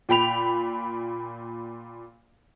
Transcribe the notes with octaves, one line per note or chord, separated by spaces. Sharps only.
A#2 G5 B5 F7